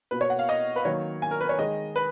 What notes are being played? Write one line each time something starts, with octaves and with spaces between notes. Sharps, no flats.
B2 A#3 B4
C#5
F#5
F5
D#5
B4
D#3 F#3 A#3 C#5
G#5
A#4
B4
C#5
D#3 G#3 D#5
B4